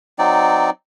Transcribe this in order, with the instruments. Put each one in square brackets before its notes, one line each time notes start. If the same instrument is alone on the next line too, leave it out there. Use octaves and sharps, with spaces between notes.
[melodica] F#3 C4 D#4 D5